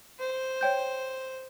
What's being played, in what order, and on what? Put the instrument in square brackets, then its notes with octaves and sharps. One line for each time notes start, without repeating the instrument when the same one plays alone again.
[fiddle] C5
[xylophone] C#5 G5 G6